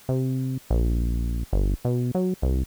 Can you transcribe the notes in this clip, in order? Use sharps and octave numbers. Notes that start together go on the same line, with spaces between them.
C3
A#1
G1
B2
F#3
C2